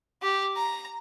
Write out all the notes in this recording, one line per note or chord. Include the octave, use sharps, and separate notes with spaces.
G4
A#5